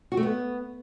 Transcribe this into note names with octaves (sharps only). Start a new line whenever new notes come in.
F#4
A3
B3